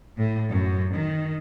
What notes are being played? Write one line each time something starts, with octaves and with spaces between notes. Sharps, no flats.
A2
F#2
D#3